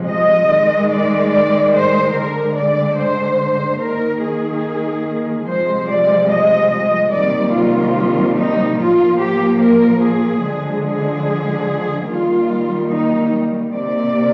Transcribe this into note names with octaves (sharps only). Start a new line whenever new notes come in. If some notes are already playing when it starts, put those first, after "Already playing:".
Already playing: C3 F3 G#3
D#5
D#3 G#3
D5
D5
C5
D3 G#3 A#4
D5
C5
D#3 A#3 A#4
G#4
C3 F3 G#3 C5
D5
D#5
D#5
C3 D#3 G3 A#3 D5
F4
D#4
A#2 F3 A#3 F4
G4
A#4
G#4
D3 F3 G#3
G#4
D#3 G3 A#3 F4
D#4
C3 D#3 A#3 D5